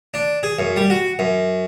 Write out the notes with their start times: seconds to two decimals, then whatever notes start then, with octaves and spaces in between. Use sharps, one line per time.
0.14 D4
0.43 G#4
0.59 F#2
0.76 G3
0.90 F#4
1.19 F#2